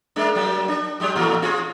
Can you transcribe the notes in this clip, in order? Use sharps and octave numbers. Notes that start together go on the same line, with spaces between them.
G#3 A#3 D4
F#3 G3 A#3
D4
F#3 G#3 G4
A2 E3 A3
C4 F4 G#4